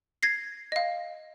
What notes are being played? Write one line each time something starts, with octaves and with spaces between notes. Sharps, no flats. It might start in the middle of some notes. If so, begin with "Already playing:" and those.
G#6 A#6 C7
D#5 F5